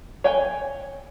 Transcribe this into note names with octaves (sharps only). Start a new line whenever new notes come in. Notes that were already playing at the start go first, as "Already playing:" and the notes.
C#5 G5 G#5